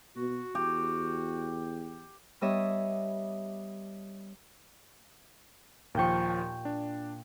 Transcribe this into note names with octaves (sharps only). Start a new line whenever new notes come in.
B2 F#4
E2 G4
G3 B3 D4 C#5 D#5 E5
D#2 A#2 F3 G5 C#6
D4